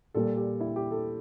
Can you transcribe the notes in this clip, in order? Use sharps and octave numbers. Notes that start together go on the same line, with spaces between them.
A#2 G3 A4
G4
E4
G4
A4